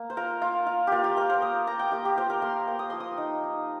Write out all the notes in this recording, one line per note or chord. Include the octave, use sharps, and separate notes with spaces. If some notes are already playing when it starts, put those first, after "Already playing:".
Already playing: A#3
C5
F4 A#4
A#3 F4
F4
A#3 F4 G4
G4
A#3 A#4
C5
A#3 D#6
A#3 A#5
G5
A#3 G4
G4
F4 C5
A#4
A#3 C6
A#3
D#6
F3 C6
D#6
D#4
D#4